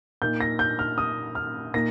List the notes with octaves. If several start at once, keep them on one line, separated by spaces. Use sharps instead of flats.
A#2 A#3 D#4 G6
A#6
G6
F6
D#6
F6
A#2 A#3 D#4 A#6